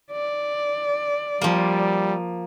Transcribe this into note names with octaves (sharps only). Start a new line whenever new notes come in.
D5
F3 G3 A#3